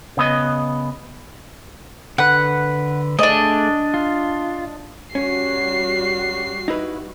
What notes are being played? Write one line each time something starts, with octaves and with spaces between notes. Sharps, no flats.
C#3 B3 D#5
D3 B4 F#5
A3 D4 G#4 D5 D#5
F4
G3 C#4 F#4 C7
D#4 E4 B4